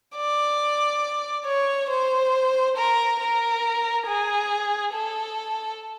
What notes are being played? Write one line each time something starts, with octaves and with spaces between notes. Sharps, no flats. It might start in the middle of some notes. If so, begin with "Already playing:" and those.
D5
C#5
C5
A#4
A#4
G#4
A4